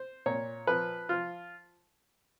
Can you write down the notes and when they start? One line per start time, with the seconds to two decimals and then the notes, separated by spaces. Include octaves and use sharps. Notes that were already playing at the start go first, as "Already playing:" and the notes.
Already playing: C5
0.26 A#2 C#5
0.67 F3 B4
1.09 F3 F4